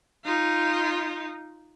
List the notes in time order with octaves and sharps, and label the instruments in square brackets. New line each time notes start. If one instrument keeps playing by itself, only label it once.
[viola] D#4 F4